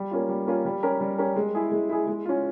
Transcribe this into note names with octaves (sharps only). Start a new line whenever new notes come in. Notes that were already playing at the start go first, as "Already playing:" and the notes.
Already playing: G3
A#3 C#4 F4
G3
A#3 C#4 F4
G3
C#4 G4 A#4
G3
C#4 G4 A#4
G#3
E4 G#4
G#3
E4 G#4
G#3
C#4 F4